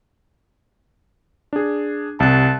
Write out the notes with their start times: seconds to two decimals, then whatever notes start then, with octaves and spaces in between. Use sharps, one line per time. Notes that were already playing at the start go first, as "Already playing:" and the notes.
1.53 D4 G#4
2.20 C2 A5 F#6